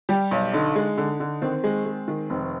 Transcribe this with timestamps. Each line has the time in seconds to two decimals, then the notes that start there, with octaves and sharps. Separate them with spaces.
0.09 G3 G4
0.31 B1
0.53 D3 D#4
0.75 G#3
0.98 D3
1.20 D3
1.42 D#3 C4
1.64 G#3
1.86 G#3
2.08 D#3
2.30 F1 C4